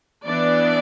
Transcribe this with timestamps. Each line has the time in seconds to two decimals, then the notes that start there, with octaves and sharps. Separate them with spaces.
0.25 E3 B3 D4 D5